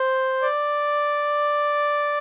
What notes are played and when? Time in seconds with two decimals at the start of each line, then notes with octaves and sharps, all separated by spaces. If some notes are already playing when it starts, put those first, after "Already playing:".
Already playing: C5
0.42 D5